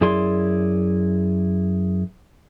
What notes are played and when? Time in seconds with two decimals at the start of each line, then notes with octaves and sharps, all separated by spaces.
0.01 F#2 E4 G#4 D5 C6